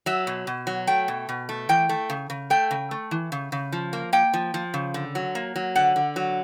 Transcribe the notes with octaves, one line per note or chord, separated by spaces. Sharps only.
F#3 E5
B2
B2
F#3
A3 G5
B2
B2
A3
E3 G5
A3
C#3
C#3
A3 G5
C#3
A3
E3
C#3
C#3
F3
A#3
A#3 G5
F3
F3
C#3
D3
F#3
A#3
F#3
D3 F#5
D3
F#3